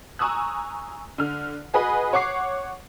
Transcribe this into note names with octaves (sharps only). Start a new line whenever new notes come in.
G#5 A#5 C#6 D#6 E6 F#6
D3 F6
F#4 G#4 B4 D#5 B5
C#5 F#5 C#6 D6 C7